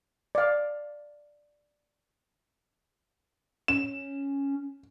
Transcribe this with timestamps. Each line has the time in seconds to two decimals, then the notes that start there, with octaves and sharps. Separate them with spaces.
0.35 D5 F5
3.68 C#4 E7